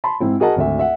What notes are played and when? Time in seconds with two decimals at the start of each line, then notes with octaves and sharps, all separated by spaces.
0.04 A5 B5 C6
0.20 G#2 C4 E4
0.40 F#4 G#4 A#4 D#5 F#5 A5
0.56 G#1 D2 E5
0.79 E5 F#5